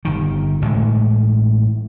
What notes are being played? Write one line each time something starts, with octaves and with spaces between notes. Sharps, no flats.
G1 C2 D#3
A1 A2 G#3 A3